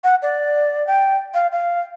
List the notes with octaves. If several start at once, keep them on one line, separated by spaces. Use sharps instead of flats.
F#5
D5
G5
F5
F5